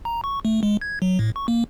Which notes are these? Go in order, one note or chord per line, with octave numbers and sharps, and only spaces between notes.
A#5
C#6
A3
G#3
G#6
F#3
A2
C#6
A#3